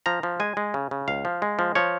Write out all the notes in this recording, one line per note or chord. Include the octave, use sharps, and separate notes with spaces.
F3 A#5
F3
G#3 G#5
G#3
C#3
C#3
C#2 F5
F3
G#3
F3
F3 C#5